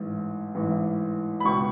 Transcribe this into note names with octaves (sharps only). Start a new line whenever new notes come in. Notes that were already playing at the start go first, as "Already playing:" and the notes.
Already playing: A1 G#2 E3
A1 G#2 E3
B5
C#2 B2 C#6